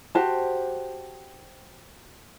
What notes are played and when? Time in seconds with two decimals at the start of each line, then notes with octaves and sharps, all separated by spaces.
0.15 F#4 G4 C5 A5